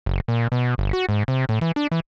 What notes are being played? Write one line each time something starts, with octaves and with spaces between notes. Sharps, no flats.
F#1
A#2
B2
G1
F#4
G#2
C3
A2
E3
D4
E3